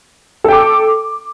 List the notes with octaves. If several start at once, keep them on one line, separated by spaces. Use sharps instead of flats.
A4 G5 D6